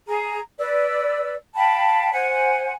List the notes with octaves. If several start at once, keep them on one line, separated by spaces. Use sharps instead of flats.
G#4 A#5
B4 D5 E6
F5 G5 A5 B5
C5 F#5 G#5